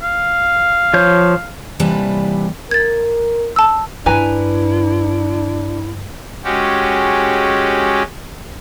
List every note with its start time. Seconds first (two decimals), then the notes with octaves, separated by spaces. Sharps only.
0.03 F5
0.94 F3 C#5 G6
1.79 D#2 C3 E3 G3 B4 A5
2.71 A#4 G#6 A6
3.56 A5 E6
4.06 G2 D4 E4 B4 G#5 A#5
6.44 G#3 C#4 F#4 G4